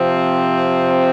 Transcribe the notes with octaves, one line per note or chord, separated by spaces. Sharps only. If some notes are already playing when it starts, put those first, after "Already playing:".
Already playing: C3 F3 C4